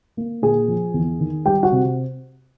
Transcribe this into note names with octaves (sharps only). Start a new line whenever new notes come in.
A#3
A#2 G#4 G#5
F3
E2
D#3
G3 G4 G5
F#4 F#5
C3